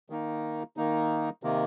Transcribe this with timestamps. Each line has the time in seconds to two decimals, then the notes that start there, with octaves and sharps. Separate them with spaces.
0.10 D#3 A#3 D#4
0.77 D#3 A#3 D#4
1.43 C3 D#3 A#3